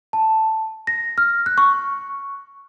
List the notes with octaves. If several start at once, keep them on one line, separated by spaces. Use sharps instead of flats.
A5
A#6
F6
F#6
C#6